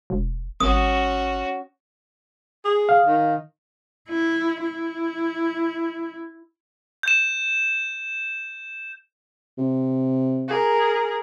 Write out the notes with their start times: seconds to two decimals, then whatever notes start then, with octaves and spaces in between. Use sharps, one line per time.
0.10 E1
0.60 G#1 C#4 F#4 D#6
2.65 G#4
2.89 F5
3.06 D#3
4.09 E4
4.64 E4
7.03 G6 E7
9.58 C3
10.48 G#4 A#4